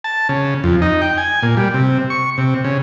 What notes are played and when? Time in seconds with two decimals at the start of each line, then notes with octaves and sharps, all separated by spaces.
0.04 A5
0.29 C#3
0.64 F2
0.82 D#4
1.02 G5
1.18 G#5
1.43 A#2
1.57 G3
1.74 C3
2.10 C#6
2.38 C3
2.64 C#3